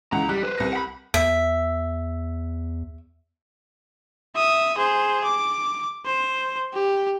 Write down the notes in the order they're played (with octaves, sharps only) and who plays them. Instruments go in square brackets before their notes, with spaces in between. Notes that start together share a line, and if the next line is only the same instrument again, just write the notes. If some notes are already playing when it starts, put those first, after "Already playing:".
[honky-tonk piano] C#2 E3 F#5 [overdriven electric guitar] A#5
[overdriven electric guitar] G3 [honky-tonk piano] F#6
[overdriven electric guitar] B4 C5
[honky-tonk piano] C2 A#6
[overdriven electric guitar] F#5 B5
[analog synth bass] E2 [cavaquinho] E5
[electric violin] E5 D#6
G#4 C5
D6
C5
G4